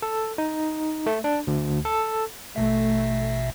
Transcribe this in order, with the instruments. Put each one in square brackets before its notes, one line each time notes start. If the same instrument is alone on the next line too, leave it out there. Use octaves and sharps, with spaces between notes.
[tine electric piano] A4
D#4
A3
D4
D2
A4
[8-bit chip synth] A1 B2 E5 [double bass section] A3